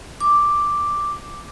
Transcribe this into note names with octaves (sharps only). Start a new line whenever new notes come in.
D6